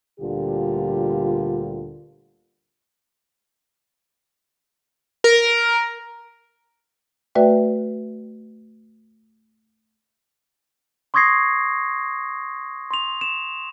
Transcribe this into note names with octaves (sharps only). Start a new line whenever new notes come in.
D2 A#2 D3 G3 F4 G4
A#4
A3 F#4 B4 D5 E5 G5
C6 C#6 D#6 G#6 A#6 C7
C6 F7
E7